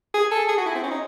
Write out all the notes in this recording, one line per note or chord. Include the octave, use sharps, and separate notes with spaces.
G#4
A4
G#4
F#4
E4
C4
C#4
D#4